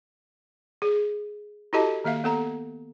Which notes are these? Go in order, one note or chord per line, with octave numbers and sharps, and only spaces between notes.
G#4
E4 F#4 G4 A4 D#5 A5
D#3 A#3 E5 F5
B3 A4 A#5